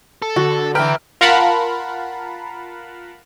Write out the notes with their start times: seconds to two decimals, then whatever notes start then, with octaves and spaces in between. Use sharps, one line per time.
0.22 A4
0.36 D3 F#4
0.75 B4 E5 G5 A#5 F6
1.21 F4 A#4 F5 F#5 A5 B5